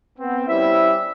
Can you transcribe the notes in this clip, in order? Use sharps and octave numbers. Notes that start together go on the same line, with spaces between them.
B3 C4
G3 C#4 E4 C5 E5